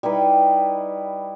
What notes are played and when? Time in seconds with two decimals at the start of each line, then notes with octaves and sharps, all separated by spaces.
0.03 G3 D#4 E4 B4